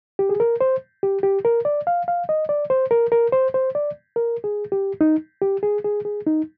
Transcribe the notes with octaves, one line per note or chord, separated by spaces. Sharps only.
G4
G#4
A#4
C5
G4
G4
A#4
D5
F5
F5
D#5
D5
C5
A#4
A#4
C5
C5
D5
A#4
G#4
G4
D#4
G4
G#4
G#4
G#4
D#4